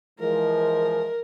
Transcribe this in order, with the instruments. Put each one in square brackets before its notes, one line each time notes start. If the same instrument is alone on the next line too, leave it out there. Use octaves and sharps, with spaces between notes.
[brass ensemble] E3 F3 G#3 [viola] A#4